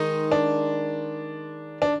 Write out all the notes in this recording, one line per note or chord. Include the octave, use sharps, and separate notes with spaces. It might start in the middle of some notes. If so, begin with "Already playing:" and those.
Already playing: D#3 G#3 D#4
D4
D4